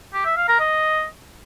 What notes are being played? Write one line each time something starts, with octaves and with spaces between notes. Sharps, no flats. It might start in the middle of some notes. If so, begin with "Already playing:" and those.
G4
E5
F5
A#4
D#5